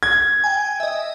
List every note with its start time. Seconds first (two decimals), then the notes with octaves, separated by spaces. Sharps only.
0.03 G#6
0.44 G5 G#5
0.80 D#5 E5